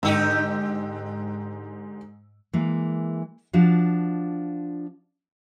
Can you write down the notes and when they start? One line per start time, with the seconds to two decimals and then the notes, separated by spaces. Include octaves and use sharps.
0.03 G#2 D3 D#4 G4 E6
2.53 E3 G#3 A#3
3.53 F3 D4 F4 F#4